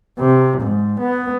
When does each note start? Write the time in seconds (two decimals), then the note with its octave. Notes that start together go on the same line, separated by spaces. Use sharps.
0.20 C3
0.61 G#2
1.00 B3